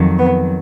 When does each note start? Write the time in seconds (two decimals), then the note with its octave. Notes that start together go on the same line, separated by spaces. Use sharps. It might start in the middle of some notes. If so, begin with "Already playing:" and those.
Already playing: F2 D#3 F#3
0.19 B3